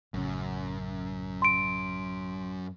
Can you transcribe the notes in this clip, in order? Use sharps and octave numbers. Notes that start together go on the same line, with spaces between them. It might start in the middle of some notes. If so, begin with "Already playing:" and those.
A1 F#2 C#3
C6 D7